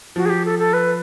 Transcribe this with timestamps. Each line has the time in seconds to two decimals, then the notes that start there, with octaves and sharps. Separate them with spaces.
0.16 F3 F#4
0.26 G#4
0.30 G4
0.45 A4
0.59 A4
0.73 B4